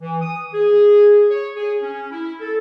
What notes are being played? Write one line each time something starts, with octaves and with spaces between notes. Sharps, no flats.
E3
D#6
G#4
C#5
G#4
C#4
E4
A4